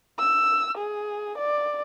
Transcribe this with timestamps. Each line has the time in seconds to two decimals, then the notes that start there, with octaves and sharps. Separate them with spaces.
0.19 E6
0.77 G#4
1.37 D5